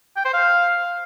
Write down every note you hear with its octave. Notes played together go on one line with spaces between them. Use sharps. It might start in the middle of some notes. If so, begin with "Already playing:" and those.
G5
C5
F5